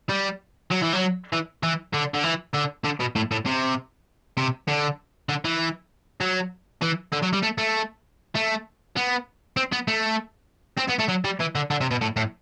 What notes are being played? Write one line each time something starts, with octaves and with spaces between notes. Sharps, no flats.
G3
F#3
E3
F#3
E3
E3
D3
D3
E3
D3
D3
B2
A2
A2
C3
C3
D3
D3
E3
F#3
E3
D3
F#3
G3
A3
A3
A3
B3
C4
B3
A3
C4
B3
A3
F#3
G3
E3
D3
D3
C3
B2
A2
A2